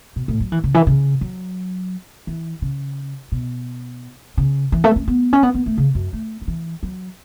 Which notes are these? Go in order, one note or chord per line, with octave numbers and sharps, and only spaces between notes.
B2
A2
F#3
E3
C#3
E3
C#3
F#3
E3
C#3
B2
C#3
E3
A3
C#4
B3
C#4
B3
B3
A3
C#3
F#2
A3
F#3
E3
F#3